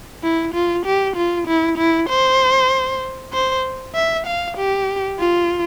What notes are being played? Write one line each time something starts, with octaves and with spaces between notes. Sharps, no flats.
E4
F4
G4
F4
E4
E4
C5
C5
E5
F5
G4
F4